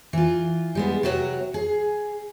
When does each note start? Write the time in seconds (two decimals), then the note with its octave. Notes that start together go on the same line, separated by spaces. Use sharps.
0.13 E3 F4
0.75 G3 G#3 B3
1.03 C3 F#3 F#4 A4 C#5
1.54 G#4